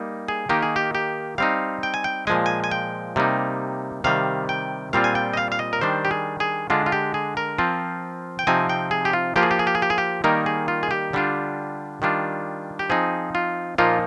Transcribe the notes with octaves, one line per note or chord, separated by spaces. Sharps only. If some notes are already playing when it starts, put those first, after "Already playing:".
Already playing: G3 A#3 D#4
G#4
D#3 A#3 D#4 G4
G#4
G4
G4
G3 C4 D#4 F5
G5
G#5
G5
A#2 F3 G#3 G#5
G#5
G#5
G5
C3 G3 A#3 D#4
C3 D#3 G3 F5
G5
A#2 G3 C4 F4 F5
G#5
G5
D#5
F5
F5
D#5
A#4
D#3 G3 D4 C5
G4
G#4
G#4
D3 G#3 D4 F4
F4
G4
G#4
A#4
F3 C4 F4
G5
C3 F3 C4 D#4 G#5
G5
G#4
G4
F4
F3 A#3 F4 G4
G#4
G4
G#4
G4
G#4
G4
G#4
G4
D#3 G3 A#3 D#4 A#4
G#4
F4
G#4
G4
D3 G3 D4 F4
D#3 G3 D4 F4
G4
F3 C4 D#4 G#4
F4
A#2 F3 A#3 D#4 F4